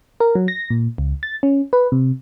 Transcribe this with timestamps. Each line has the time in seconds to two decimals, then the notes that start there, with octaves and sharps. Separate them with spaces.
0.20 A#4
0.35 F#3
0.48 A#6
0.70 A#2
0.98 C#2
1.23 A6
1.43 C#4
1.73 B4
1.92 C3